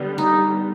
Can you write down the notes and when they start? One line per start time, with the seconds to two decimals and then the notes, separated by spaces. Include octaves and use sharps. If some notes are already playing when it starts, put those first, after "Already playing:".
Already playing: D3 G3 B3
0.18 D#4